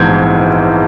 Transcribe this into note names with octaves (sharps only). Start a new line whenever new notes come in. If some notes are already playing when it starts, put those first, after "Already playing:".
Already playing: A#1 G#2 E3 G#3 B3 G6 G#6